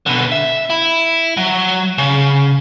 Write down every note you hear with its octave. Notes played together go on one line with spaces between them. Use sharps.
B2 D3
E5
E4
F#3
C#3